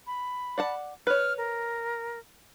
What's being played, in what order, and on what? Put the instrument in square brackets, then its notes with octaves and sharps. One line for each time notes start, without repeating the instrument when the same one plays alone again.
[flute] B5
[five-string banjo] D5 F#5 A5
[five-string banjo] B4 C#5 [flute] F6
[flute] A#4